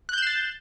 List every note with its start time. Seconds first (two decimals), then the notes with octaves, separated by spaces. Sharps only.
0.09 F#6
0.13 G6
0.18 E7
0.22 C7
0.27 A6